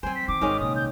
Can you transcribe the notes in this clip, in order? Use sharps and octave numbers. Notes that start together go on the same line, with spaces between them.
F3 F#3 C4 C5 G#5
B6
D#3 D6
G#1 D#3 G#3 C#4
C2 A#2 D#6
G6